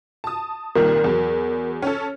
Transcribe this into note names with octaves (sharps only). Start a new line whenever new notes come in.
A5 D#6
C2 A#2 D#3 A#4
E2 F#3
C#4 A4